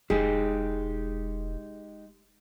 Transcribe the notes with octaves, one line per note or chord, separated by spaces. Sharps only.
E1 G#3 D#4 G4 G#4